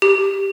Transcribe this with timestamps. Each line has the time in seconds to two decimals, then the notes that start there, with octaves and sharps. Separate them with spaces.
0.02 G4